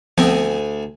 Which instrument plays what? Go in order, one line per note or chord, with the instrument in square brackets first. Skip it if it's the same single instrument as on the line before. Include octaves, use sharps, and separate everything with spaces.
[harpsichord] D2 G#5 [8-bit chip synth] F3 B3 C4